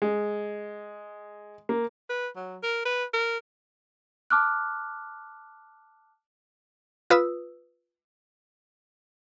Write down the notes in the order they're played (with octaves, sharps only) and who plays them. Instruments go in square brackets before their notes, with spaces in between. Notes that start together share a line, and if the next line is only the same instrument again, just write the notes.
[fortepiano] G#3
A#3
[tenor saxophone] B4
F#3
A#4
B4
A#4
[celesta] A5 D6 F6 F#6
[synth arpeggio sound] F4 B4 D#6 E6